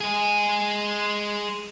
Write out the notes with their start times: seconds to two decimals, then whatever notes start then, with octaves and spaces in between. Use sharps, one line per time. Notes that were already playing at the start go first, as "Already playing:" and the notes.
0.01 G#3 G#4